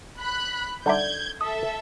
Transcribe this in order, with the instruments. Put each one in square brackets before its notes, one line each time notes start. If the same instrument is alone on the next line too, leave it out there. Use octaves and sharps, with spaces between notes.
[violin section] B5 F#6
[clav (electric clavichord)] D3 D5 [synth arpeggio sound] G3 D#4 E5 [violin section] G6 G#6
[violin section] A4 E5 [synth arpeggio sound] D#6